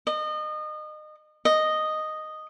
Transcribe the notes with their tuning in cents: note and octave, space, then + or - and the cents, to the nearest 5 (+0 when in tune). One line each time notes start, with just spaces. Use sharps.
D#5 -30
D#5 -5